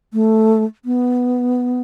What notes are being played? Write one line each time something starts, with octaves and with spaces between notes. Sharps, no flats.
A3
B3